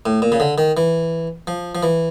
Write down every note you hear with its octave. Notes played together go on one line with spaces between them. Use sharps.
A2
A#2
C#3
D3
D#3
E3
F3
F3
E3